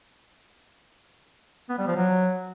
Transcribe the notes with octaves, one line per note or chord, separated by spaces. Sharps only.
B3
G3
F3
F#3